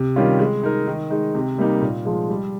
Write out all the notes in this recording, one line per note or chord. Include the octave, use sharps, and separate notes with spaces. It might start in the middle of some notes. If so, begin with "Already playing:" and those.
Already playing: C3
D#3 G3 C#4 F4
G#3
D#4 A#4
D#3
G#3 D#4
C3
G3 A#3 D#4
A#2
F3 G#3
G3